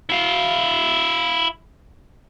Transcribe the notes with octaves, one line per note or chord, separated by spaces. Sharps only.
E4 F5